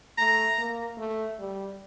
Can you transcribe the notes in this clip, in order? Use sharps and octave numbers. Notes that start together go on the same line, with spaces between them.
A3 A#5
A#3
A3
G3